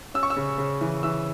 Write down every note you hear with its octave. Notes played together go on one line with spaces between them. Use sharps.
C#4 E6
C#6
E6
C#3
C#3
E3
E3 E6